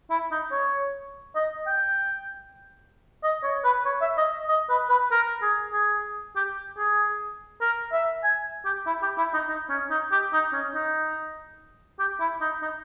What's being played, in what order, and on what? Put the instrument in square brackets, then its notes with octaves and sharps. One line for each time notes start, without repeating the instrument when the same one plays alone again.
[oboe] E4
D#4
C#5
D#5
G5
D#5
C#5
B4
C#5
E5
D#5
D#5
B4
B4
A#4
G#4
G#4
G4
G#4
A#4
E5
G#5
G4
E4
G4
E4
D#4
D#4
C#4
D#4
G4
D#4
C#4
D#4
G4
E4
D#4
D#4